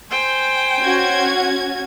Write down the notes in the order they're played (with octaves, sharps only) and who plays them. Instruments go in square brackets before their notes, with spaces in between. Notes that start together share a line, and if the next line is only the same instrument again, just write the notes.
[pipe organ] C5 G6 [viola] G5 G#5
[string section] C#4 F#4 G#6